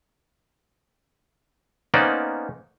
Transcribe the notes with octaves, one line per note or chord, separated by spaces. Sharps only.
A#3 B3 C#4 D#4 C5 D5